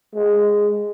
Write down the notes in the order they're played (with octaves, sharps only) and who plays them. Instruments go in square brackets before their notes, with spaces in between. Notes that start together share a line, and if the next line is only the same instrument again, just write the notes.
[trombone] G#3